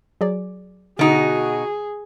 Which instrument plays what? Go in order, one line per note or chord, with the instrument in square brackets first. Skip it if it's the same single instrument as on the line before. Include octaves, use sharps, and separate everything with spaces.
[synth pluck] F#3 G#4 D5
[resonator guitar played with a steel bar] B2 D#4 [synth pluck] D3 [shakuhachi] F#4 [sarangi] G#4